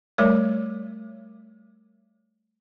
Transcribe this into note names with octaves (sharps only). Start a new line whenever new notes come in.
G3 A3 A#4 C#5